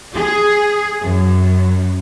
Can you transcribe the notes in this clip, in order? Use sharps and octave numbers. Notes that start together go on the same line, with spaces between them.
G#4
F#2